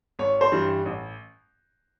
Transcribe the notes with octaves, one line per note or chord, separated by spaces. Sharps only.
G#1 C#5
C5
G2 E3 G3
A1